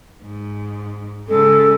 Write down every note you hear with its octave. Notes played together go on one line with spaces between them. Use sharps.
G#2
C#3 G#3 A4